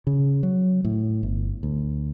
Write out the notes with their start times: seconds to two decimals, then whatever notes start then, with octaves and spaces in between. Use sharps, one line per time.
0.07 C#3
0.43 F#3
0.85 A2
1.23 G1
1.63 D2